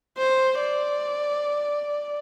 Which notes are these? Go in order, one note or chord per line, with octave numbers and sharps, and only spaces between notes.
C5
D5